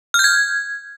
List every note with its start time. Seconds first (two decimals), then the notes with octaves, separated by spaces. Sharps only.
0.14 F6
0.19 G6
0.24 G#6